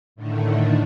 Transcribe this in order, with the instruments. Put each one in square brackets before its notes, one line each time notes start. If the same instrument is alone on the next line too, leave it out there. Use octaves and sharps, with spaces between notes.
[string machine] A2 D3 D#3 A3